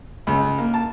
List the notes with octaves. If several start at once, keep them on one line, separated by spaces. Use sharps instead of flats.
C#2
A#3
A5